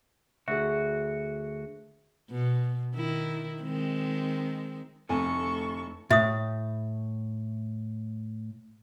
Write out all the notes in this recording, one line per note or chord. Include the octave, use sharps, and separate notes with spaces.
D2 F#4 G#4 E5
B2
D#3 E4
D#3 G#3 C4
F1 D2 A2 A4 G#5 C#6
A2 E5 D#6